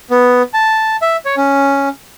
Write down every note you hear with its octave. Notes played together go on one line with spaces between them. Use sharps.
B3
A5
E5
C#5
C#4